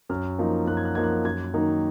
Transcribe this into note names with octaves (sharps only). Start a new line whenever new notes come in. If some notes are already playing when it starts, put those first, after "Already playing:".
F#2 F6
F3 A#3 D#4
F#2 F#6
G#6
F#6
F3 A#3 D#4 G#6
F#6
F#2 G#6
D#3 F#3 A#3 D#4